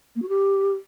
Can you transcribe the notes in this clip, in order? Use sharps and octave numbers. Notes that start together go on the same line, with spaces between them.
A#3
F#4
G4